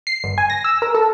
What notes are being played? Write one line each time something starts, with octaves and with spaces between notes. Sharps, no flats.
C7
G1
G#5
A#6
E6
A#4
A4